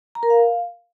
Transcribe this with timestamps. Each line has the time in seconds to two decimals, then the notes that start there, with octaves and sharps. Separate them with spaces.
0.15 A#5
0.23 A#4
0.30 F5